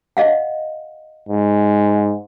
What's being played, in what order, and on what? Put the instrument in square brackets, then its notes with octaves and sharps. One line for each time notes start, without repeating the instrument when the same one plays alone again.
[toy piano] D#5 F5 F#5
[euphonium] G#2